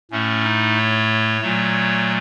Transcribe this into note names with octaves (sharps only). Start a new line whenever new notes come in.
A2 A3 C#4
D#4
C#5
A#2 F#3 A3